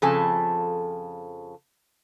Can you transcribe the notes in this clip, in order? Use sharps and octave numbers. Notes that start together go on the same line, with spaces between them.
F2 C#3 F3 A4 G#5 A5